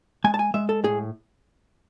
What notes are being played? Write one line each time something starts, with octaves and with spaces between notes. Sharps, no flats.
G#3 G#5
A5
G#5
G#3 E5
A4
A2 G#4